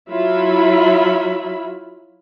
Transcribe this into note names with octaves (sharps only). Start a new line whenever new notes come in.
F#3 E4 F4 E5 B5